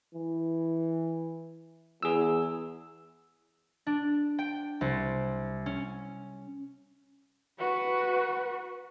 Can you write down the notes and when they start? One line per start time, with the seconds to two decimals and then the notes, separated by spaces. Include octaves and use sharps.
0.14 E3
2.03 E2 G#4 E6
3.87 D4
4.39 G5
4.81 C2
5.66 C#4
7.59 F#4 B4